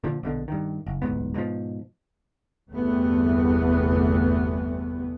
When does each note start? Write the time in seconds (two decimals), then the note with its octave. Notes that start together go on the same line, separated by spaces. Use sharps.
0.04 A#2 D3 F3
0.23 A#1 B2 D3
0.48 G2 D#3
0.86 F#1
1.02 D1 B1 G#2 B3
1.34 G#2 B2 D#3 F3
2.70 G1 E2 G2 C3 A3 B3